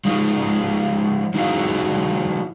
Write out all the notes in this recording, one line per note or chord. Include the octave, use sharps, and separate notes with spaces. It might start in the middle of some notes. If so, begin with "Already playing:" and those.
F3 G#3 D#4 F4
F3 D#4 E4 F#4 G#4 F5